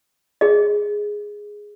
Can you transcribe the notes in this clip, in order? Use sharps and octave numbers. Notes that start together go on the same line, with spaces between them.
G#4 D#5